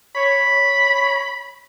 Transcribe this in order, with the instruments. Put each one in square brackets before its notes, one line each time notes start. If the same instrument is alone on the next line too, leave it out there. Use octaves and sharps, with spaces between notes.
[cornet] C#5 [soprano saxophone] B5
[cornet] C#5